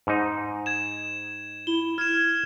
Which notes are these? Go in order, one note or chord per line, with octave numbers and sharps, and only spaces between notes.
G#2 D#4
G#6 E7
E4 G7
F6 G#6 E7